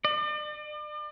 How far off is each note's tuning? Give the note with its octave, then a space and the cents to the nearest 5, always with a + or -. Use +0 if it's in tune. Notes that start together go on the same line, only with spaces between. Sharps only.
D5 +40